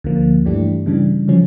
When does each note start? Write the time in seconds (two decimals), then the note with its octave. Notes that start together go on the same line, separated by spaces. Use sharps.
0.04 D2 D3 F3 A#3
0.45 G2 E3 A3 D4 G4
0.86 C#3 E3 G3 D4
1.28 C#3 F3 C#4